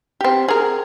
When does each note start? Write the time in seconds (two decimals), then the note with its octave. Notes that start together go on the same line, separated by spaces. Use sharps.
0.21 C4 G4
0.48 G#4 A#4